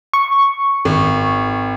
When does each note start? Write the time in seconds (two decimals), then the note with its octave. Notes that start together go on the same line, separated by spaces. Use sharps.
0.14 C#6
0.85 G#1